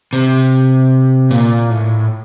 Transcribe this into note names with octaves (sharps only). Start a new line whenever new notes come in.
C3
A#2
A2